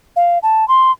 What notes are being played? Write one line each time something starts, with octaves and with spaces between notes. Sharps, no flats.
F5
A5
C6